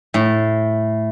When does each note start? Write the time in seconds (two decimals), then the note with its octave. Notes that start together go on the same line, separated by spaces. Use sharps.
0.14 A2